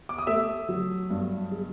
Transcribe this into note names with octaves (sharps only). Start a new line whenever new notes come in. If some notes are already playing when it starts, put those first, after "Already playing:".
D6
D#6
A3 E5 E6
F#3
G2
G#3